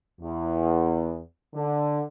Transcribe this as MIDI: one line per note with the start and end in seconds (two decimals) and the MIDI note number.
0.21 1.19 40
1.55 2.02 50